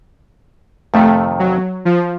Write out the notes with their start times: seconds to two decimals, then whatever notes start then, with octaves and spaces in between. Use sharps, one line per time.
0.94 F2 C3 D#3 A3
1.39 F#3
1.85 F3